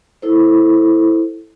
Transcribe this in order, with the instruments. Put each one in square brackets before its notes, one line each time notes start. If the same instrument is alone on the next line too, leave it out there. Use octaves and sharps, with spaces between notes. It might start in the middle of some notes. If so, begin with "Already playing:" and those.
[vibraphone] E4 A4 C5